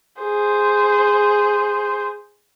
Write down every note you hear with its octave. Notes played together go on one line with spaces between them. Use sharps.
G#4 C5